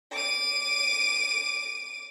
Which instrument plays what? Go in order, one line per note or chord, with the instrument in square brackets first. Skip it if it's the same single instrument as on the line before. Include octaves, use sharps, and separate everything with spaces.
[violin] D6 D#7